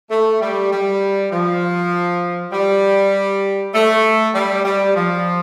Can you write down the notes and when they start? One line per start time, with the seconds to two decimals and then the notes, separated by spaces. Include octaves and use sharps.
0.11 A3
0.41 G3
0.72 G3
1.32 F3
2.52 G3
3.74 A3
4.34 G3
4.65 G3
4.96 F3